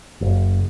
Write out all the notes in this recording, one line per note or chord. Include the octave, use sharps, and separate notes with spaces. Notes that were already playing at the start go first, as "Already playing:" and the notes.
F#1